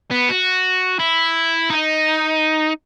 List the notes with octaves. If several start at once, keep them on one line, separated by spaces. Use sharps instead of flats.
B3
F#4
E4
D#4